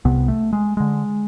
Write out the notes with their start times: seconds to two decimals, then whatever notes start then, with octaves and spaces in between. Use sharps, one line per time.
0.05 C2 C3 B3
0.28 A3
0.53 G#3
0.77 D3 G#3